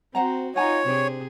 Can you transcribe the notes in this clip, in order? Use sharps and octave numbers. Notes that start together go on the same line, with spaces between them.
C4 F#4 C5 F#5 A#5
D#4 F4 C#5 F#5 G#5 A#5
C3 D4 G#4 C5